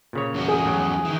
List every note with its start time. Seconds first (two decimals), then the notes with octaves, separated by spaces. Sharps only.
0.13 A#2 C#3 C#5
0.34 E2 C#4 F#4
0.48 G#4
0.65 A2 F#3
1.05 D#3 E3